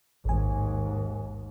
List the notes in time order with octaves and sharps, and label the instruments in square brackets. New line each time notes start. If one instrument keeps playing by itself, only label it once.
[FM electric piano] A1 G#5 [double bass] D#2 G#2